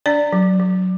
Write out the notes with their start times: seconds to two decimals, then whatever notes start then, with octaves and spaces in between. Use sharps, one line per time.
0.06 D4 D5
0.33 F#3
0.59 F#3